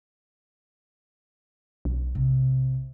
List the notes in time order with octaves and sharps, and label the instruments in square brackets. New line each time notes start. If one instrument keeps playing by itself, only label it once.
[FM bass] B1
[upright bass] C3